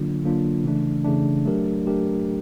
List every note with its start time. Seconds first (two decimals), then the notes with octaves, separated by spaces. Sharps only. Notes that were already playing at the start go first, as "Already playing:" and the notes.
Already playing: D3 F#3 A#3 D4 F4
0.23 D3 F#3 A#3 D4 F4
0.65 C#3 E3 A3 D4
1.04 C#3 E3 A3 D4
1.45 F#3 A3 D4 G4 A#4
1.87 F#3 A3 D4 G4 A#4